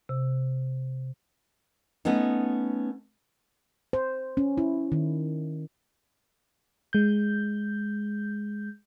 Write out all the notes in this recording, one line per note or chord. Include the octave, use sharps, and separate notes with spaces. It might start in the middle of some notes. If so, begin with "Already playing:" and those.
C3
A3 B3 C#4 D#4
C5
C#4
E4
D#3
G#3 G6